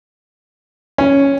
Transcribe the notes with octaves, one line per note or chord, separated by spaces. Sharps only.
C#4